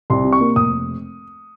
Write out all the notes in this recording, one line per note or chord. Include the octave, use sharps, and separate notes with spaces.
C2 C6
C3
C#6
A#3
F1 D#6